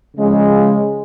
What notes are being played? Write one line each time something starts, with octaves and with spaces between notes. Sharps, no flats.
C#3 F3 G#3